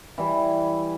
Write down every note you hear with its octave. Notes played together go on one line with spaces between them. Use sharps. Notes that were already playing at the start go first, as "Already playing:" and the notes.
E3 G3 E4